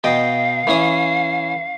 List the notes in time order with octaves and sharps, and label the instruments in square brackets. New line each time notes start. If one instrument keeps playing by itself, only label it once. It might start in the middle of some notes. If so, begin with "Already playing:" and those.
[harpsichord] B2 D#5 G5 [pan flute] F5
[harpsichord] E3 C#4 D#6